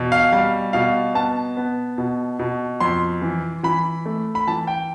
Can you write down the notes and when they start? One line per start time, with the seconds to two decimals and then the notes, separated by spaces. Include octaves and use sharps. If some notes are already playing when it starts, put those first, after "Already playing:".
Already playing: E2 B2
0.12 F5
0.33 G3 F5
0.73 B2 F5
1.15 B3 A5
1.57 B3
1.98 B2
2.39 B2
2.80 F2 C6
3.22 E3
3.63 E3 B5
4.06 A3
4.35 B5
4.47 E3 A5
4.67 G5